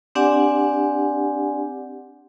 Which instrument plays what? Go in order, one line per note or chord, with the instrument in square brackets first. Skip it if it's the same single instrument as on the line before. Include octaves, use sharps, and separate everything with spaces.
[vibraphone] C4 D4 G4 D5 F#5 G#5